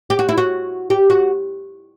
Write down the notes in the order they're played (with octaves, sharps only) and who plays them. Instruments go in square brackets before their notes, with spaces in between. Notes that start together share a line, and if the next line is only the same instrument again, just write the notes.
[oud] G4
F#4
E4
F#4
G4
F#4